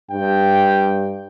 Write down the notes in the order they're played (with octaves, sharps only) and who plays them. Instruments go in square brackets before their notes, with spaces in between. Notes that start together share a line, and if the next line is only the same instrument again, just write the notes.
[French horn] G2 [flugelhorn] G5